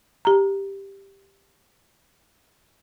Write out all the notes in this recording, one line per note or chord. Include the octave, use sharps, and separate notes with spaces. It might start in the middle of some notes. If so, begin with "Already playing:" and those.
G4 A#5